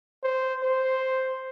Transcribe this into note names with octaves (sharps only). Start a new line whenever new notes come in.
C5
C5